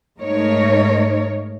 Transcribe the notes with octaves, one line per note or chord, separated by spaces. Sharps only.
G#2 A3 D#4 A#4 C#5